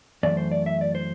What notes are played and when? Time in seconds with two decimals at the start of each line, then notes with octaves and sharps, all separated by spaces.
0.23 F#2 E3 A3 D5
0.37 C5
0.52 D5
0.66 E5
0.81 D5
0.95 C5